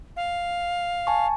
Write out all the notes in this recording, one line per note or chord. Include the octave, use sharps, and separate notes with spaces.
F5
G#5 A5 C#6